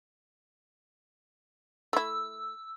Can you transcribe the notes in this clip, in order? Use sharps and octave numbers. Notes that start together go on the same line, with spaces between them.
A3 E4 E6